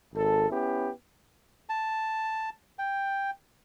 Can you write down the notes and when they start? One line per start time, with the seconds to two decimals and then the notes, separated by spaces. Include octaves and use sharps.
0.14 G#1 A4
0.49 B3 C#4 E4 G4
1.69 A5
2.79 G5